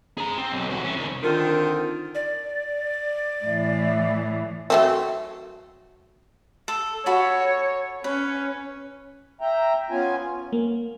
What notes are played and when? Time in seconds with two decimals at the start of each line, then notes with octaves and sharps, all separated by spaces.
0.18 G#4 A#5
0.38 C4
0.52 B1
0.69 C2 F#4
0.84 E3 C#4
0.96 C2 D#3
1.23 D3 D#3 C4 F4 A#4
2.15 D5
3.45 A2 E3
4.70 F#3 A3 C4
6.68 A4
7.06 F#4 A4 C#5 B5
8.04 C#4 B4
9.41 E5 G5 A#5
9.90 B3 C#4 F4 G#5
10.53 A#3